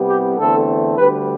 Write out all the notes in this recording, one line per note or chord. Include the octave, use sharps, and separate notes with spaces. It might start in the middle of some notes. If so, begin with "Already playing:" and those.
Already playing: C2 C3 G3 B3
G4
E2 D3 A3 C4 A4
D2 D3 G3 B4